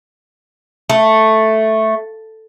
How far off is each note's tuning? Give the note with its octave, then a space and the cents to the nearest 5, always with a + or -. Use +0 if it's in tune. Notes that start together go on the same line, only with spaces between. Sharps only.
A3 +0